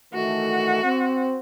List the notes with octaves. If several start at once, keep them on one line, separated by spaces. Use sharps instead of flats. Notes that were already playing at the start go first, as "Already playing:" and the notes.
D#3 E3 A3 F#4
C4